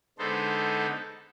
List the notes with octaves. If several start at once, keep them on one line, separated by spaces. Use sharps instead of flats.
D3 G#3 B3 D#4 A4 C5